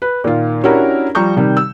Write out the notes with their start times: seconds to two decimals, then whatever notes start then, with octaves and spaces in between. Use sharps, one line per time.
0.02 B4
0.24 A#2 D#3 F4
0.64 C#4 D4 E4 F#4 G4 A#4
1.15 F3 G3 A#5 C#6 G6
1.37 C3 D#3 G3
1.57 E6